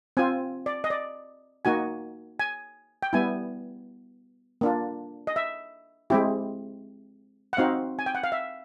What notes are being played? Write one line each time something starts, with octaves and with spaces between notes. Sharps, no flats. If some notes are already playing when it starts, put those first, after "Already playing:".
C4 F4 G#5
D5
D#5
D5
A#3 D#4 F#4 G#5
G#5
G5
G3 B3 E4 G#5
A#3 D4 F4
D#5
E5
G#3 C4 E4 G4
F#5
C4 D#4 F#4 F5
G#5
G5
F#5
F5
E5